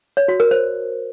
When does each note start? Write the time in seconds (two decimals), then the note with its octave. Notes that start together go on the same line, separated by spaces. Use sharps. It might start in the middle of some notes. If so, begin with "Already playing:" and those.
0.17 C#5
0.28 F#4
0.40 A#4
0.51 C5